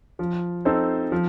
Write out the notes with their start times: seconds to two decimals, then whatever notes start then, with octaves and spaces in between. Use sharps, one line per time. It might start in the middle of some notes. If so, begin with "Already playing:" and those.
0.19 F3
0.65 C4 D#4 A4 C5
1.12 F3